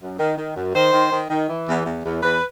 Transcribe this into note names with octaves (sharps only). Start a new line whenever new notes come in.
F#2
D#3
D#3
F#2
D#3 C5
D#3
D#3
D#3
E3
E2
E2
E2
E2 B4